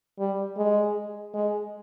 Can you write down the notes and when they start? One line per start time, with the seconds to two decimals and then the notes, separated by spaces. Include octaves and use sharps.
0.19 G3
0.57 G#3
1.34 G#3